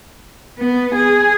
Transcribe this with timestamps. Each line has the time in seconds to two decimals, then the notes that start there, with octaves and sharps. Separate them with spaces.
0.58 B3
0.95 G#4